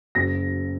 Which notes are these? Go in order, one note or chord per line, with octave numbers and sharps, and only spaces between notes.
F#1 A#6